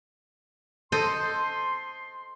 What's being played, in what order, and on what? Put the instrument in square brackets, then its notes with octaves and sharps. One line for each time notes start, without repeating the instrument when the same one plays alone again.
[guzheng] A4 C5 D#5 [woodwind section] C6